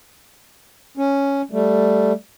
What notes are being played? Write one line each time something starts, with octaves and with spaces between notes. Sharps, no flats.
C#4
G3 A3